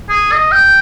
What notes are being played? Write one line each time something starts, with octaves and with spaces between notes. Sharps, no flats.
G#4
D#5
G5